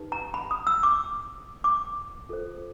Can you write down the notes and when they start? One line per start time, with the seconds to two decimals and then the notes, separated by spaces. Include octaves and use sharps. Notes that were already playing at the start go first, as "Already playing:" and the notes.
Already playing: D#4 G4 B4
0.12 A#5
0.34 B5
0.51 D#6
0.67 E6
0.83 D6
1.64 D6
2.29 F4 A4 C5